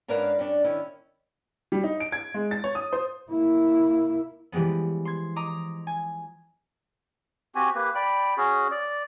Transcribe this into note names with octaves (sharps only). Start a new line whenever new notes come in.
G#2 C#4 D4 A#4 B4 F5
G2 C#4 D4
D#3 C#4 E4
G3
D#4
D7
G#6
G#3
A6
C#5
D#6
C5
A#3 E4
E3 F3 G3 G#3 B3
C6 G#6
D#5 A#5 D6
G#5
C4 F#4 G4 G#5
A#3 G4 B4
D5 G5 B5
C#4 F#4 G#4
D5